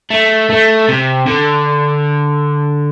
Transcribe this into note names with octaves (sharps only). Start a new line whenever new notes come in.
A3
A3
C3
D3